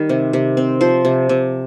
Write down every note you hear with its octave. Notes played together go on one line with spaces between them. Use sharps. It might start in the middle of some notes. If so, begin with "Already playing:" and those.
Already playing: D#3 G3
C3
C3
C4
F3 C5
C3
C3